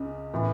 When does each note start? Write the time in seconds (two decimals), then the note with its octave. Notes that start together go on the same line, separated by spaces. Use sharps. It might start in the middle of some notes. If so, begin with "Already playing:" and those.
Already playing: C#2 C#3
0.34 A2 E3